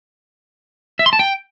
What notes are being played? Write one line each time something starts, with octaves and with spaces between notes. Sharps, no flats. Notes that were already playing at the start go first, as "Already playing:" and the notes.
E5
C6
A5
G5